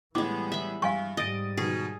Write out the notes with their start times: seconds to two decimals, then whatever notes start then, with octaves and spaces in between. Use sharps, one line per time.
0.15 A2 E3 G3 G#3 B3 D6
0.52 E5 B5
0.82 G2 F5 G#5 C#6
1.17 G#2 G3 D#5 D#6 A6 D7
1.57 B2 D#3 G#4